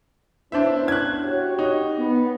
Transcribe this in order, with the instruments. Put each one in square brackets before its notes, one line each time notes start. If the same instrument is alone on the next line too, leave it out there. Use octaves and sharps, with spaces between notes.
[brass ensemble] B3 C#4 E4 [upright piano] D4 C5 E5
[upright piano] F#6 G#6
[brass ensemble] F#4 G4 C#5
[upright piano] D#4
[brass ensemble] B3